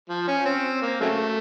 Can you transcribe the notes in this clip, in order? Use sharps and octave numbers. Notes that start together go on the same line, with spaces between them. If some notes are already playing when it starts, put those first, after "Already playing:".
F3
C#4
C4
A#3
C#3 F#3 A3